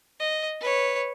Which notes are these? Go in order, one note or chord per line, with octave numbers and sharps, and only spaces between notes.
D#5
B4 C#5